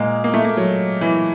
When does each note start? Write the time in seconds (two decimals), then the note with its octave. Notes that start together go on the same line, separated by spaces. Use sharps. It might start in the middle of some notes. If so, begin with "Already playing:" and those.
Already playing: A#2 G#3 A#3
0.24 A#3
0.34 A3
0.44 A#3
0.57 F#3
1.01 E3